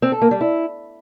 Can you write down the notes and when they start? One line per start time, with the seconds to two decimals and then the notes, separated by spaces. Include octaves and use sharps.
0.02 C4
0.12 A4
0.22 A#3
0.31 G3
0.41 E4